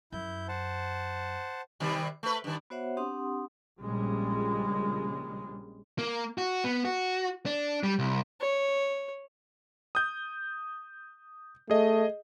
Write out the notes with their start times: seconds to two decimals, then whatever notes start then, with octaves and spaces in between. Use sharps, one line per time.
0.12 F#2 E4 G6
0.48 C5 F#5 A5
1.80 C3 D#3 G3
2.23 A3 B4
2.44 G2 D#3
2.70 B3 F#4 C5 C#5 E5 F#5
2.97 C4 D4 G4 F#5 C6 D#6
3.80 A#1 A#2 C#3 G3 G#3
5.99 A#3
6.38 F#4
6.64 B3
6.85 F#4
7.46 D4
7.83 G3
7.99 C2
8.41 C#5
9.95 D#6 G6
11.70 A3 G#4 D#5